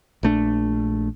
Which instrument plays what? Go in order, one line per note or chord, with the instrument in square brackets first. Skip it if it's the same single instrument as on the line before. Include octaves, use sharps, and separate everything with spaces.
[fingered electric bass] A#1 A3 D4